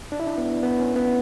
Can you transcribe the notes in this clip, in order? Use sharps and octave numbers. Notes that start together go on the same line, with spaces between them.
D4
E4
D4
B3
B3
C#4
B3